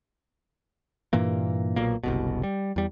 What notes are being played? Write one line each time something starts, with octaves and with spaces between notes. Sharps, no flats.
G2 A#2 E3 A#3
B1 A#2 A#3
F#1 C2 B2
G3
E2 G3